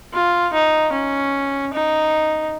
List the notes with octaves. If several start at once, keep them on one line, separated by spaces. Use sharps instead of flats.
F4
D#4
C#4
D#4